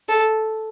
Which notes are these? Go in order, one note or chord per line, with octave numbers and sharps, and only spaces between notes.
A4